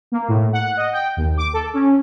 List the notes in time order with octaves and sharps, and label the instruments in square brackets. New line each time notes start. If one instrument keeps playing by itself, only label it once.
[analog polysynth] A#3
A2
F#5
D#5
G5
D#2
D6
A4
C#4